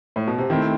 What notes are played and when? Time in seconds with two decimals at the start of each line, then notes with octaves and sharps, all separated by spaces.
0.16 A2
0.27 B2
0.38 C3
0.50 D#3 A3 C4 E4